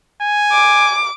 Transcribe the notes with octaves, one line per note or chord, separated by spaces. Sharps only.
G#5
D6